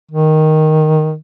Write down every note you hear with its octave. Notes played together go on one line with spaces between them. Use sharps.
D#3